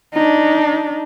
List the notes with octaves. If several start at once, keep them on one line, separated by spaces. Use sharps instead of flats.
D4 D#4